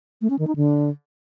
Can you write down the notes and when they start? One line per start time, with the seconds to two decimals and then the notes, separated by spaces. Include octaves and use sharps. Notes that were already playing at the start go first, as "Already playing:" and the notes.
0.21 A3
0.30 C#4
0.39 D#3
0.47 D#4
0.56 D3